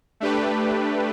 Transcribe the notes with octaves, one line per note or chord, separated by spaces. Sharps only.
A3 D4 G4 B4